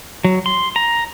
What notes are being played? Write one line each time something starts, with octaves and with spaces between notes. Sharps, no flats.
F#3
C6
A#5